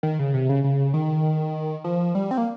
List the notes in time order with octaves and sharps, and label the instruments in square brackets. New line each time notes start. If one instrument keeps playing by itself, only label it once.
[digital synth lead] D#3
C#3
C3
C#3
C#3
D#3
F3
G3
C4
A#3